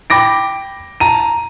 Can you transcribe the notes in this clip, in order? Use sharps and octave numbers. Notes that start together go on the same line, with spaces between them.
G5 B5 D6 A#6 D7
A5 A#5 D#7